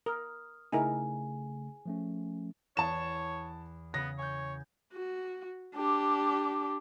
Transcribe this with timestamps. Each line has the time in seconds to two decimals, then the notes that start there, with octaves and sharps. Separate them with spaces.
0.06 A#4 D#6 F6
0.72 C#3 A3 D#4 E4 G#4 A#4 G#5
1.86 F3 A3 C#4
2.77 E2 C#5 A5 E7
3.94 C#3 B3 A#6
4.19 C#5 G#5 G6
4.94 F#4
5.75 D4 G4